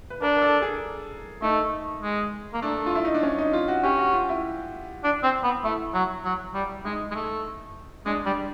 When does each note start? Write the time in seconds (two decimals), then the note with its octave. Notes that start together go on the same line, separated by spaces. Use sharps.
0.10 B4
0.22 D4 A#4
0.37 A#4
0.42 A4
0.62 G#4
1.42 A3 D#4
2.02 G#3
2.54 A#3
2.62 A3 D4
2.86 F4
2.95 E4
3.05 D#4
3.14 D4
3.23 C#4
3.38 D#4
3.53 F4
3.68 F#4
3.83 C#4 G4
3.98 F#4
4.14 F4
4.29 E4
5.04 D4
5.23 C4
5.44 B3
5.64 A3 E4
5.94 F#3
6.24 F#3
6.54 G3
6.85 G#3 D#4
7.11 G#3
7.15 A3
8.06 G#3 D4
8.26 G3